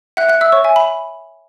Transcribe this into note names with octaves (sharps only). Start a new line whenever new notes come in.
E5 F#5 F#6
F#5 F#6
E5 E6
C#5 C#6
E5 G#5
B5